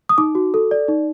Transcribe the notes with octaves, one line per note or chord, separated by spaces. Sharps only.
D#6
D#4 D6
F#4
A4
D5
D#4